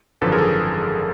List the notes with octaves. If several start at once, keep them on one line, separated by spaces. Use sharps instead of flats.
G#1 F#2 D3 F3 A4 B4
G#4 A#4
A4
G#4